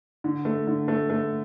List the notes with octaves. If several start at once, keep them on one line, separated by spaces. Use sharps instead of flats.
D3
A3
D3
A3
A3